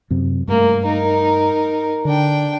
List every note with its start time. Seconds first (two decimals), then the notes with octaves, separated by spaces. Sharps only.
0.10 F#2 C3
0.48 G2 A3 A#3
0.84 D#4 A#4
2.05 D3 D4 G5